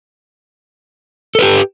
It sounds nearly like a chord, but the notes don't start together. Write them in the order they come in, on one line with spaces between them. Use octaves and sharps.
A4 B4 G4